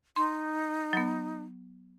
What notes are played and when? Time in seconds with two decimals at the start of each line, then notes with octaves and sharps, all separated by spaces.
0.16 D#4 C6
0.93 F#3 B3